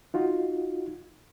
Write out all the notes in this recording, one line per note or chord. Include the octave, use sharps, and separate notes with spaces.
D#4 F4 F#4